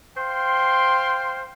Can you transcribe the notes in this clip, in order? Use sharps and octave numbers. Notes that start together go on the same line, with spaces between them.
C5 F5 G5 C6